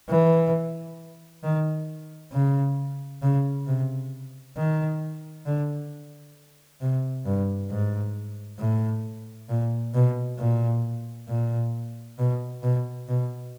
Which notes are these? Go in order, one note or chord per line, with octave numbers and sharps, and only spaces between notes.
E3
D#3
C#3
C#3
C3
D#3
D3
C3
G2
G#2
A2
A#2
B2
A#2
A#2
B2
B2
B2